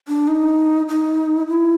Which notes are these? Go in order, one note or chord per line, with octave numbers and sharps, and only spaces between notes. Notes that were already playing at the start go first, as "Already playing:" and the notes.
D4
D#4
D#4
E4